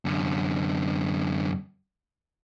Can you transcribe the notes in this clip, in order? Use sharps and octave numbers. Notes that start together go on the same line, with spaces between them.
F#2 D3